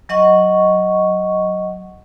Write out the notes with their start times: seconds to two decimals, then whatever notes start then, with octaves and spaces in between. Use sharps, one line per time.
0.09 F#3 D#5 F#5 C#6